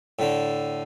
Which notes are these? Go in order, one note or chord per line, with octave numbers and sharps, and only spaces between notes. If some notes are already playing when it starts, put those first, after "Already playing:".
A2 D3